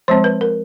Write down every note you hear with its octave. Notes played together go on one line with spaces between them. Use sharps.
F3 G#3 C4 C5
B4
A#4